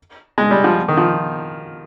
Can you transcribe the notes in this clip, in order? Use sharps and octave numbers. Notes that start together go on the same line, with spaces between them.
G#3
G3
F3
D#3
F3